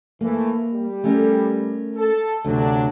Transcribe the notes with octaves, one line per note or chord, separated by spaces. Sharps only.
E3 A3 A#3
G3
A3 C#4 A#4
A4
D2 C3 F#3 D4